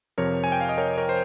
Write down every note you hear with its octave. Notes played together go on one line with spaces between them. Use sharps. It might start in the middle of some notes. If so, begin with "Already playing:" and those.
F2 C3 F3 A#4 C#5
G#5
G5
F5
D#5
A#4 C#5
A#4 C#5
C5